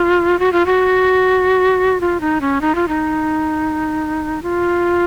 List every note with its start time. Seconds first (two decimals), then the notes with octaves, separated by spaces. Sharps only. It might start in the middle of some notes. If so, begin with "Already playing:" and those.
Already playing: F4
0.39 F#4
0.52 F4
0.66 F#4
2.01 F4
2.21 D#4
2.41 C#4
2.61 D#4
2.75 F4
2.88 D#4
4.43 F4